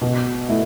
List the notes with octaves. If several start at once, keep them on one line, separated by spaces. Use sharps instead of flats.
B2
A3 E4